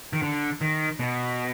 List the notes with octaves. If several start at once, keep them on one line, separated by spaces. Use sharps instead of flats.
D#3
D3
D#3
B2